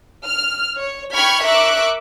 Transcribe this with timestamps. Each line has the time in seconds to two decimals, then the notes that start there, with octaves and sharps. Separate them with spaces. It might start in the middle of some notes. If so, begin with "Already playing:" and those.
0.25 F6
0.76 C#5
1.12 G5 B5 C#6 F6 G#6 B6
1.43 A#4 E5 C#6 D6 F#6